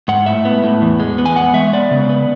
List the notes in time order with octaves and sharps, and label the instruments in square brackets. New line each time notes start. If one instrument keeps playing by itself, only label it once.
[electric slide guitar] G#2 F#5
A2 E5
B3
A2
E2
G#3
B3
G#5
E2 F#5
G#3 E5
B3 D5
C#3
B3